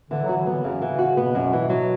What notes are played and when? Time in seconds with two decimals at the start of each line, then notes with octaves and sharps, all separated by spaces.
0.10 D3 E3
0.24 F#3 F#4
0.37 E3
0.46 D3 B3
0.63 F#2 C#3
0.82 E3
0.99 F#4
1.17 B2 B3
1.35 F#2
1.53 E3
1.69 F#3